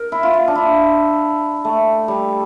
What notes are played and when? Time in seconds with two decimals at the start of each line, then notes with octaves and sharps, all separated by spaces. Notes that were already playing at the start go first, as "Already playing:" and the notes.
Already playing: A#4
0.12 E4
0.23 F4
0.34 F4
0.48 D4
0.55 E4
1.65 A3
2.08 G3